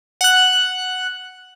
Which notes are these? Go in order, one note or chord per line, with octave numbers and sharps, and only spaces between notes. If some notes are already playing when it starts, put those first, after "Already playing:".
F#5 F#6